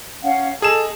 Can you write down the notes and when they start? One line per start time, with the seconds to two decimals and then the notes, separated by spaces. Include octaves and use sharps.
0.23 C#4 F5 F#5
0.62 G#4 A4 D#5 E7